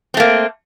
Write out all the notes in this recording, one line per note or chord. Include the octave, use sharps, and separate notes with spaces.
A3 A#3 C4